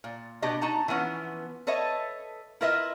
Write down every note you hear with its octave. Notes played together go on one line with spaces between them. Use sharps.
A#2
B2 D4 G4 D#5
D#4 F#4 A5 A#5
E3 F3 B3 C#4
A4 B4 C#5 D#5 E5
E4 F4 A#4 B4 D#5 E5